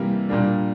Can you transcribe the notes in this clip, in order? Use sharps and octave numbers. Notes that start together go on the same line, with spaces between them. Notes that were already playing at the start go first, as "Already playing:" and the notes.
Already playing: C3 E3 G3 A#3
A#2 G3 A#3 D4